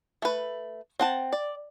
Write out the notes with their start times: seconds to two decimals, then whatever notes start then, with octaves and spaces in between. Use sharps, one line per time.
0.22 A3 B4
1.00 C4 F#5 A5
1.32 D5